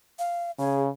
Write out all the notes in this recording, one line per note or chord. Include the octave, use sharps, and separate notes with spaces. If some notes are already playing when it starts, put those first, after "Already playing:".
F5
C#3 G#4